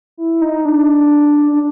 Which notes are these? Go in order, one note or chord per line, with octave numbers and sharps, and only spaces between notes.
E4
D#4
D4
D4